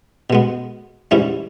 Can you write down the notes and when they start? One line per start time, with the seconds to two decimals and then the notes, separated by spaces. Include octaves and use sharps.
0.30 B2 G#3 B3
1.11 G#2 E3 G3 C#4 E4